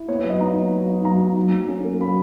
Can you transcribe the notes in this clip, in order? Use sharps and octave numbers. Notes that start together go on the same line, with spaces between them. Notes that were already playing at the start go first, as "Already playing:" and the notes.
Already playing: E4
B3 C#5
F#3 B4
D#5
D#4 A#5
B3
F#3
D#4
F#3 A#5
D#4
F#3
F#3
C#4
A#3
F#3 B5